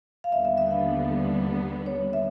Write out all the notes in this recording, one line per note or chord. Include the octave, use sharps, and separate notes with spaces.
F5
D#2 D3 G3 B3 E5
E5
E5
F5
C#5
E5